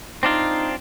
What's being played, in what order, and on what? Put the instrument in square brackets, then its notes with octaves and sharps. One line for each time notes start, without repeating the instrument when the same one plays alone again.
[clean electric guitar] C4 D4 F4 [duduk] D#4